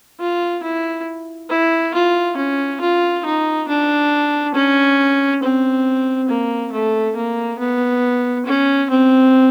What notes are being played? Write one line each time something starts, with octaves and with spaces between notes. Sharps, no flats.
F4
E4
E4
F4
C#4
F4
D#4
D4
C#4
C4
A#3
A3
A#3
B3
C#4
C4